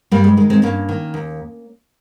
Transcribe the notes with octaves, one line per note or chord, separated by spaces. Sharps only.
G2 G3 A#3
G#3
D#3 G#3
G#3 C4
G2 A#3 C#4
D#3
D#2